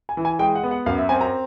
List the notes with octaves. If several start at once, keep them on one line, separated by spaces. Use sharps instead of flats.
G#5
E3
G#5
G#3 G5
F#5
B3
F#5
F#2 F5
E5
C4 G#5
A#5